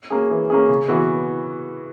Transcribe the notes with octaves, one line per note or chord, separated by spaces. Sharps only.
A#3 C#4 G#4
E3
A#3 C#4 G#4
C#3
E3 B3 F#4